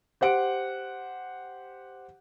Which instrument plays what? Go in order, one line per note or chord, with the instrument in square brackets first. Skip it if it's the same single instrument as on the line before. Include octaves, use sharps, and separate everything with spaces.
[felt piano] G4 C5 F#5 D7